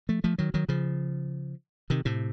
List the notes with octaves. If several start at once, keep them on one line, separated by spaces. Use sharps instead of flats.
F3 A3
F3 A3
D#3 F#3
D#3 F#3
C#3 F3
C3 D#3
A2 C3